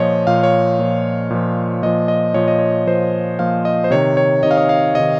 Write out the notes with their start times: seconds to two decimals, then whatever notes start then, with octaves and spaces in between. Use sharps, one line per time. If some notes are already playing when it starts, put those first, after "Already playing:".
Already playing: A#2 F3 C#5 D#5
0.27 A#2 F3 F5
0.43 C#5
0.79 A#2 F3
1.30 A#2 F3
1.83 A#2 F3 D#5
2.08 D#5
2.34 A#2 F3 C#5
2.48 D#5
2.59 C#5
2.87 A#2 F3 C5
3.39 A#2 F3 F5
3.65 D#5
3.84 C5
3.90 C3 D#3 C#5
4.17 C#5
4.43 C3 D#3 D#5
4.51 F5
4.57 D#5
4.69 F5
4.95 C3 D#3 D#5